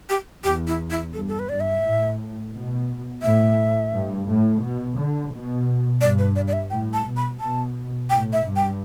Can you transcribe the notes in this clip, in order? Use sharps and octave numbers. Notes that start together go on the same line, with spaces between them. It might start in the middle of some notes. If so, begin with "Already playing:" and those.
G4
E2 G4
E4
E4
G2 A4
A4
B4
G2 D5
E5
A2
B2
A2 E5
G2
A2
B2
D3
B2
G2 D5
B4
D5
D5
E5
A2 G5
A5
B2
B5
B2 A5
A2 G5
E5
G2
G5